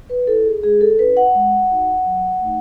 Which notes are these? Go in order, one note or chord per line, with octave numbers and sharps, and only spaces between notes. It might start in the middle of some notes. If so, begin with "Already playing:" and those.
B4
E4 A4
G#4
G#3 G#4
A4
C#4 E4 B4
F#5
G#3
D#4 F#4
F#3
A3 D#4